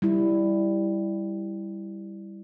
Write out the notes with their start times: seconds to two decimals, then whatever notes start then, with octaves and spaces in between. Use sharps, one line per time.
0.02 G3 E4